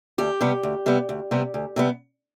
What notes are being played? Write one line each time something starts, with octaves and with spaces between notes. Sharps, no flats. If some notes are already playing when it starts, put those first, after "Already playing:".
D2 G4
C3 G3 B3
D2
C3 G3 B3
D2
C3 G3 B3
D2
C3 G3 B3